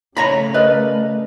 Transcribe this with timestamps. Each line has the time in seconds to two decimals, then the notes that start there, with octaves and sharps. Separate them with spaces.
0.17 C#3 A3 C#5 A#5 B5
0.54 A#4 B4 D5 D#5